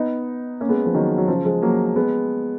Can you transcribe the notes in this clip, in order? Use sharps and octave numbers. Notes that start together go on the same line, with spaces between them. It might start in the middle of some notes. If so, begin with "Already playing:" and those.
Already playing: B3 D#4
A#3 C#4
G#3 B3
F3 G#3
D#3 F#3
F#3
C#3 F3
F3 G#3
F#3 A#3
G#3 B3